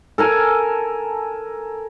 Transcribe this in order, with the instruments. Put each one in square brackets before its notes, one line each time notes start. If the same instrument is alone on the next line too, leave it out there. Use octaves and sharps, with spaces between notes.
[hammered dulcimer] A4 A#4 G#5